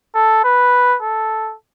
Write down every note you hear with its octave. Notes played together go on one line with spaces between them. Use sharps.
A4
B4
A4